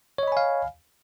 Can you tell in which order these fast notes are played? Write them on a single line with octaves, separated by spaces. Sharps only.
C#5 D#5 B5 G#5 F5